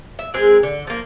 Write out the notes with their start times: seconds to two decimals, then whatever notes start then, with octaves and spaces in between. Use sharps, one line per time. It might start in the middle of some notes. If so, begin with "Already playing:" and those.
0.19 E5
0.34 G#3 C4 G#4 A#4
0.63 D3
0.87 F3 A#3